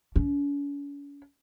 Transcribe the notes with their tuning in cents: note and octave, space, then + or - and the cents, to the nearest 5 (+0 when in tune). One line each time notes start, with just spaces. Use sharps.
C#4 +45